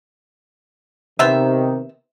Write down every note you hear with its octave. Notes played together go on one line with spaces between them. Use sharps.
C3 D#3 B3 C5 E5